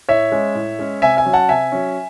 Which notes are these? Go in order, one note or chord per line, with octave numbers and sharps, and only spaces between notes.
A2 C#5 E5
G#3 C#4
A2
G#3 C#4
C3 E5 G#5
E5 G#5
F#3 C#4
F#5 A5
C3 E5 G#5
F#3 C#4